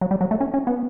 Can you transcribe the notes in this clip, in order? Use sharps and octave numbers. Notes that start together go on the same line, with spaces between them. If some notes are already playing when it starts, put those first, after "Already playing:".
F#3
G3
F#3
A3
C#4
C#4
B3